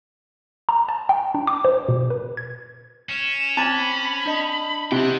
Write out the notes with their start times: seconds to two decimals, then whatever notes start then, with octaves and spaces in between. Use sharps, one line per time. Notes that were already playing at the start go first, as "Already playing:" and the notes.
0.69 A#5
0.89 A5
1.09 G5
1.34 D4
1.47 D6
1.65 C5
1.89 B2
2.10 B4
2.37 G#6
3.09 C#4 E7
3.57 C4 A5 B5
4.26 D4 D#5
4.92 C3 D#4 F#5 G5